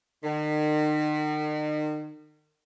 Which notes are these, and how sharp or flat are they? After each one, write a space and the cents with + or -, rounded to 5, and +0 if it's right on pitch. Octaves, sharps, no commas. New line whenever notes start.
D#3 -40